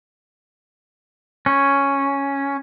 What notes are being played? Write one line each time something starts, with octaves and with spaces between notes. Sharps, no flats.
C#4